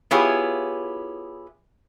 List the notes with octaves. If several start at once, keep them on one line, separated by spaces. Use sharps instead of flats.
B3 E4 F4 G4 G#4 C#5